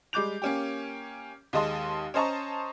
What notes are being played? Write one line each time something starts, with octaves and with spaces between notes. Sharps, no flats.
G3 G#3 D6 G6 F7
A#3 C#4 G4
D#2 G#3 D#5 A5 C6
C#4 C5 D#5 A5 A#5 C#6